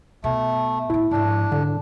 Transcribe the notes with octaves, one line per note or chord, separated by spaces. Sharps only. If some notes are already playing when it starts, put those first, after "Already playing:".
B2 A3
A2 D3 E4
G#2 F3 D4
G#2 D3